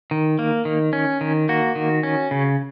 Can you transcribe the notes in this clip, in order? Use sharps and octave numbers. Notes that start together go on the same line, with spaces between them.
D#3
A#3
D#3
C#4
D#3
A#3 F#4
D#3
C#4
C#3